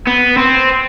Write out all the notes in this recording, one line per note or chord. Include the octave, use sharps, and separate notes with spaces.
B3
C4